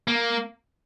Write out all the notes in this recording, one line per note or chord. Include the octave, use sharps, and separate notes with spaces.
A#3